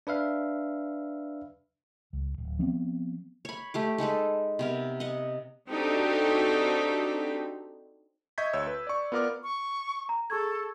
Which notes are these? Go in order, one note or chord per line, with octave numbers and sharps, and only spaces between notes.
D4 B4 E5 F5
C#2
D1
F3 B3 C4
C#5 B5
A3 G4 D6
G#3 D#4 A4 B4
C3 B3 A#4
D#5 F#5
C4 D4 D#4 F#4 G4 A4
D#5 E5 C#6 G6 G#6 B6
D2 C#5 E6
B4
D5 C#6
B3 F4 A#4 D5 D6 F6
C#6
A#5
G#4 A4 C#6 G#6